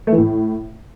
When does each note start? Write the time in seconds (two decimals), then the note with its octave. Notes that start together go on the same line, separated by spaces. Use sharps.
0.07 A3
0.12 E3
0.18 A2